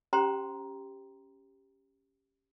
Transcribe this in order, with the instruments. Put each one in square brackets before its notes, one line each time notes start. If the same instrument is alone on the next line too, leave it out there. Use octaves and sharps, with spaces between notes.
[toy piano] C#4 G4 C5 G5 A#5 C6